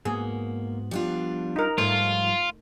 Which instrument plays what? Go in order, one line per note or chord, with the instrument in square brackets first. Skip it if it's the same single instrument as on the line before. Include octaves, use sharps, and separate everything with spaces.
[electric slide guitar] G#2 B3 F#4 [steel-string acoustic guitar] A#3 [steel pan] G#4
[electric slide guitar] F3 B3 [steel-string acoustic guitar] G3 D4 F4
[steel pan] D#4 A#4
[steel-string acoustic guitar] G#2 F3 C#5 [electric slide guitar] G3 [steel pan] A3 [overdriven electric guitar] F4